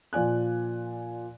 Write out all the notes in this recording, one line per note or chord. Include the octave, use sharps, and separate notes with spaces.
A#2 F3 D5 G#5 F#6